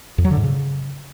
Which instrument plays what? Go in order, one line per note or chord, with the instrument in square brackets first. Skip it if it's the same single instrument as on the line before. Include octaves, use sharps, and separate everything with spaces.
[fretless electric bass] F2
F#3
D3
G#2
C#3